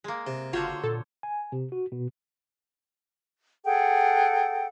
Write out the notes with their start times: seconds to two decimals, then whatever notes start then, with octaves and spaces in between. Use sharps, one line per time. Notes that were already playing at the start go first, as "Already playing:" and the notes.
0.04 G#3 A#3
0.27 C3
0.53 F#1 D3 F4 F#4 C5 C#5
0.83 A#2 A4
1.23 G#5
1.52 C3
1.72 F#4
1.92 B2
3.65 G#4 A4 F#5 G5